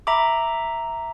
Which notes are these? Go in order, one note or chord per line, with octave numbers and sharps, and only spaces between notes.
E5 A#5 B5 D6